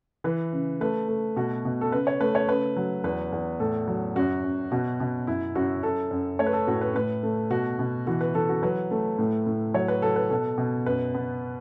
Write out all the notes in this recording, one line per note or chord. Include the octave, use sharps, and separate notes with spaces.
E3 B4
C#3
A3 B4
A3
B2 F#4
B2
A4
C#3 B4
C#5
A3 B4
C#5
C#3 B4
F#3
E2 B4
E2
A2 A4
F#3
F#2 F#4
F#2
B2 F#4
B2
F#2 E4
F#2 F#4
F#2 A4
F#2
A3 C#5
B4
A4
A2 F#4
B4
A2 B4
A3
B2 F#4
B2
E3 F#4
B4
E3 A4
F#4
F#3 B4
A3
A2
A2
F#3 C#5
B4
F#3 A4
B4
B2 A4
B2
F#2 B4
B3